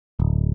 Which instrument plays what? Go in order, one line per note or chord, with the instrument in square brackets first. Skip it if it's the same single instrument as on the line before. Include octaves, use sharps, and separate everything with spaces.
[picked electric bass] D1